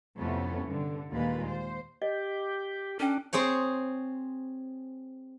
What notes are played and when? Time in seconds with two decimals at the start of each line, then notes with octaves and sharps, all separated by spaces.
0.17 F2 A2 C3 A3 B3 C#4
0.66 G2 D3
1.12 D#2 A#2 G#3 F4 B4
1.47 C5
2.02 G4 D#5
3.00 C#4 D4 A4 G5
3.33 C4 G#4 C5 C#5